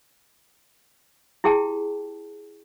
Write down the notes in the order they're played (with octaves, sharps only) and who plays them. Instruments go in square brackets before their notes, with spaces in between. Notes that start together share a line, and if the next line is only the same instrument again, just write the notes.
[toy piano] E4 G4 G#4 G5 A5